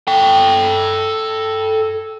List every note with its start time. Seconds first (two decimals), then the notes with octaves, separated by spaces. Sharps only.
0.08 A4 G5